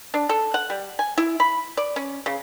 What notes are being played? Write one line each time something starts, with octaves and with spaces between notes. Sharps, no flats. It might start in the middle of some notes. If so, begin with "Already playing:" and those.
D4
A4
F#5
G3
G#5
E4
B5
D5
C#4
C#3